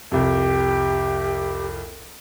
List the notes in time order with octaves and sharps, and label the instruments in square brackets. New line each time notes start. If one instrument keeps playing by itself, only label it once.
[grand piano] C2 F2 [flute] G4